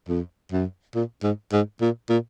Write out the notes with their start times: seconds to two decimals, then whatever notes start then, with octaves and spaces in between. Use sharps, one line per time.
0.08 F2
0.52 F#2
0.95 A#2
1.23 G#2
1.52 G#2
1.81 A#2
2.09 A#2